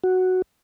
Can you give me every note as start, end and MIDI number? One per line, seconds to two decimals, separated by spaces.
0.04 0.42 66